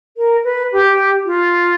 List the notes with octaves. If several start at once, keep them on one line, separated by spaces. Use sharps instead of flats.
A#4
B4
G4
F4